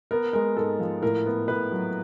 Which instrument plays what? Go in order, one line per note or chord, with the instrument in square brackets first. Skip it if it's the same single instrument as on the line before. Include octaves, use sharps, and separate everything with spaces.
[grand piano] B3 A#4
G#3 A#4
G#2 A4
F3
A2 A#4
B3
A2 B4
F#3